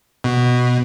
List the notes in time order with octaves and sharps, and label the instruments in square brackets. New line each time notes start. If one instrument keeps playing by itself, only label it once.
[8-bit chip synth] B2